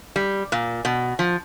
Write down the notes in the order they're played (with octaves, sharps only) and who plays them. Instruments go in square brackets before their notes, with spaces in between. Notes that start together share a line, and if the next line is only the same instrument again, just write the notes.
[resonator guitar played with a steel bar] G3
A#2
B2
F3